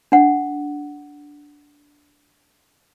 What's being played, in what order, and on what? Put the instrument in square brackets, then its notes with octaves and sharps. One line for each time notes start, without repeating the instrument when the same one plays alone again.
[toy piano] D4 F#5